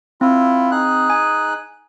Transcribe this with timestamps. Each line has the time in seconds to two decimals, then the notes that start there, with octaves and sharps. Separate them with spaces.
0.21 C4 E4 F4
0.71 D#4 G#4 F#6
1.10 G#5